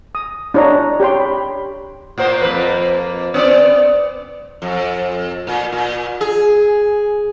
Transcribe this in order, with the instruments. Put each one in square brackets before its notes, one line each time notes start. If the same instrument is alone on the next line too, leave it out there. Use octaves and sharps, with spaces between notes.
[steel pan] D#6
D4 E4 C#5 D#5 A#5
G4 C#5 G5 C6
B5
[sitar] A2 A#3 C5
F2 A#3 B4
B3 C4 D5
F2
A#2
A#2
G#4